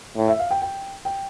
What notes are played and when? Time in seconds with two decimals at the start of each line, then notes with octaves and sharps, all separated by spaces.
0.17 A2
0.28 E5
0.39 F5
0.51 G5
0.62 G5
1.05 G5